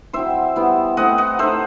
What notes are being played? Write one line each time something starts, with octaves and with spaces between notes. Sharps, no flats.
F#3 C4 E4 C5 E5
G3 B3 E4
A3 C4 E4 D#5 F#5
D#5 F#5
A3 D#4 C5 E5